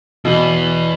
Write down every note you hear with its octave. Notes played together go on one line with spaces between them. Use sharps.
E2 B2